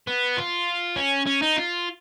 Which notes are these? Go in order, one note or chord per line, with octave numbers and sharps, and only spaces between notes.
B3
F4
C#4
C#4
D#4
F4